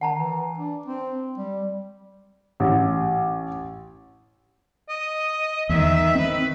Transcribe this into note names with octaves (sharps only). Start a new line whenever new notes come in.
D#3 F#5 A5 A#5
E3
D4
C4
G3
A1
D#5
E2 D#3 E5
D#3 C4 B4